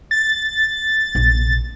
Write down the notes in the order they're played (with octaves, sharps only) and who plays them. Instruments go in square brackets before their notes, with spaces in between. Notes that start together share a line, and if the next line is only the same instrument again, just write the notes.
[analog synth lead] A6
[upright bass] A#1 C3